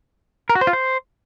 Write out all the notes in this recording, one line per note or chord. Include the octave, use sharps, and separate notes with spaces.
A#4
F#4
C5
F4
C5